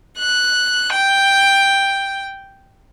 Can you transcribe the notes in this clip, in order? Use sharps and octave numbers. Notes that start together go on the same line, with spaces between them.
F#6
G5